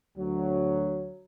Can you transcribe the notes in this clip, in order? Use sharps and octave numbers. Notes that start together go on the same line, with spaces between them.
D2 F#3